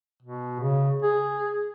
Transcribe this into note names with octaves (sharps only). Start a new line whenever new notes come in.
B2
C#3
G#4